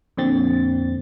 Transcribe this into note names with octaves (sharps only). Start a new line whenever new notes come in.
F2 A#2 D3 C4 A6